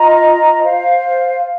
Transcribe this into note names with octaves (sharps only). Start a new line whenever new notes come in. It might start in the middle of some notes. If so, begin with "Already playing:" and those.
Already playing: F4 D#5 A#5
C5 F5